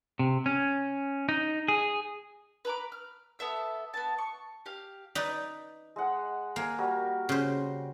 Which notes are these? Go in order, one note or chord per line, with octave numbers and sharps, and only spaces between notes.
C3
C#4
D#4
G#4
B4 A#5 D6
F6
B3 A4 E5 E6
B3 A5
C#6
G4 F5
D#4 B4 D5
G#3 F#5
A#3 A#4 G#5
G3 F#4 A#4
C#3 C5